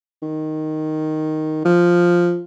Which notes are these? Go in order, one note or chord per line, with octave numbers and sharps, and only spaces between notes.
D#3
F3